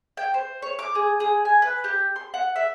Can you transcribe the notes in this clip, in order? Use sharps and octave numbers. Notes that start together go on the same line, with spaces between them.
G5
C5
C#5
D6
G#4
G#4
G#5
B4
G4
C6
F#5
E5